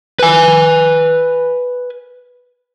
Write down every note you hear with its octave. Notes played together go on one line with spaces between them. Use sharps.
B4 G#5